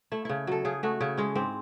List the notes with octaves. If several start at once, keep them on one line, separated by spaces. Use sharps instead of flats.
A3 E4
C#3 E4
F#3 A4
C#3 G#4
A3 F#4
C#3 E4
G#3 C#4
G#2 C4